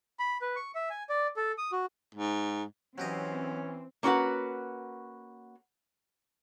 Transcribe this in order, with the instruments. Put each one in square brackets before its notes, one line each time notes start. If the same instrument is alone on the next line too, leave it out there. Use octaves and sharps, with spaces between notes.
[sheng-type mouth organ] B5
B4
C#6
E5
G#5
D5
A4
D#6
F#4
[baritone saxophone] G#2
[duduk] E3 [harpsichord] F#3 G4 D#5 [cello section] C4 [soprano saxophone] C#4
[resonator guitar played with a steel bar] A#3 C#4 F#4 G#4 B4 F#5